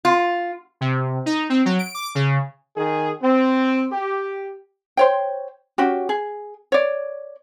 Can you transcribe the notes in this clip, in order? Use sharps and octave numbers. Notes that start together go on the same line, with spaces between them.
F4
C3
D#4
C4
F#3
D7
D6
C#3
D#3 G#4
C4
G4
C5 C#5 G5
C#4 F#4 G4
G#4
C#5 D5